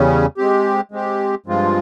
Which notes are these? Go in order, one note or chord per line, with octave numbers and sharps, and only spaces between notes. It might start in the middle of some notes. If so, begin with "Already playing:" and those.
Already playing: E2 C#3 G3 C#4
G#3 C4 G4
G#3 C4 G4
G2 F3 G#3 C4 F4